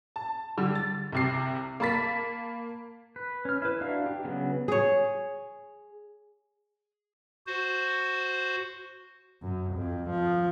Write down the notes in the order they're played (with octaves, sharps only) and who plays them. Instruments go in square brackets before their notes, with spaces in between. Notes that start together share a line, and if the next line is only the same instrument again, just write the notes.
[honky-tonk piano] A5
D3 G3
A6
C2 C3 C7
A#3 A5 B5 A6 B6
[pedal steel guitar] B4
C#4 F6
E4 B4
D4 F#4 E5 F5 A#5
G4
C#3 F#3 B3 C#4
[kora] G#4 C#5
[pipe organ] F#4 C5
[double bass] F#2
F2
F3